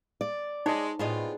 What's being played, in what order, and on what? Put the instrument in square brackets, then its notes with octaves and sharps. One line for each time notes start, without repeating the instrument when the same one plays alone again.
[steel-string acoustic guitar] D5
[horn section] G#3 [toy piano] D#4 [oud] C#5
[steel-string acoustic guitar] A2 [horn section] C3 B3 F4 [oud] D4 G#4 D#5